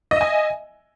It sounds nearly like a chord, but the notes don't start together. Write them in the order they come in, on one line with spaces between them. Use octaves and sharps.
D#5 E5 G#5